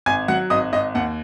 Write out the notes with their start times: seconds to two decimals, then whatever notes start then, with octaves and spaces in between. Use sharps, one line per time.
0.06 G#1 G#5 G#6
0.28 F#3 F#5 F#6
0.50 G#1 D#5 D#6
0.73 G#1 D#5
0.95 D#2 F#5